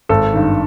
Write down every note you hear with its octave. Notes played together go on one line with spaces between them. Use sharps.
G#1 A4
G2 D#3